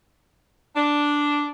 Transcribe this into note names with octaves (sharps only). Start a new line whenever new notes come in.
D4